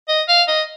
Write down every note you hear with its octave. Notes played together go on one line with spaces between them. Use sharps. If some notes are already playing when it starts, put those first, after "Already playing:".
D#5
F5
D#5